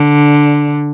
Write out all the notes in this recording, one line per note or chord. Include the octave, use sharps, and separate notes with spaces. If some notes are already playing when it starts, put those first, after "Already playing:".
Already playing: D3